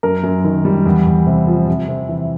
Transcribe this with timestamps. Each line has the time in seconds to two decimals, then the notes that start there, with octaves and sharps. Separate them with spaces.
0.03 F#2 A#4
0.24 F#2
0.44 D#3
0.65 G3
0.86 E2
1.06 E2
1.27 C3
1.47 F3
1.68 C3
1.88 C3
2.09 E3